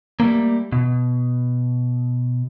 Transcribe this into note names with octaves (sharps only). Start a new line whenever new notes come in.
G3 A3 A#3
B2